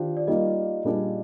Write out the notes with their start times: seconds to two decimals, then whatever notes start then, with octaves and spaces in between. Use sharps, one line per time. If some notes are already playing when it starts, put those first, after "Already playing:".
Already playing: D#3 D4 F4 G4 C5 F5
0.17 D5
0.27 G3 A#3 D#4 F4 D#5
0.84 A#2 G3 D4 F4 G#4